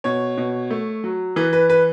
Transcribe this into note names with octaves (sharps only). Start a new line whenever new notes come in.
B2 C#5
B2
A3
F#3
E3 B4
B4
B4